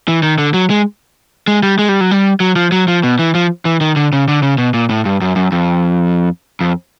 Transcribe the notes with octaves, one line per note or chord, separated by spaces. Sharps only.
E3
D#3
D3
F#3
G#3
G#3
G3
G#3
G3
F#3
G3
F#3
F3
F#3
F3
B2
E3
F3
E3
D#3
D3
C#3
D3
C#3
B2
A#2
A2
G2
F#2
F#2
F2
F2